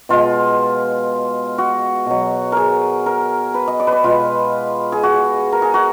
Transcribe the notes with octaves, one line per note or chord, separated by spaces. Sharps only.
B2 G#3 F4
F#4
B2 F#3
G#4 A#4
A#4
B4
D#5
D5
B4
D5
B2 G#3 F4
G#4
F#4
A#4
G#4
F#4